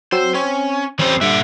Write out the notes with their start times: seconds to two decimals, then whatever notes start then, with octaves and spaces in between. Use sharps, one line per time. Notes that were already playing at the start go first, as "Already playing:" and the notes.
0.12 F#3 C4 C5 E6
0.34 C4 C#4 C#5
0.99 E2 G3 C4 C#4 C5
1.21 G2 A#2 D3 E5